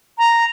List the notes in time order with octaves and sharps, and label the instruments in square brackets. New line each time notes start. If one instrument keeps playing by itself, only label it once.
[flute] A#5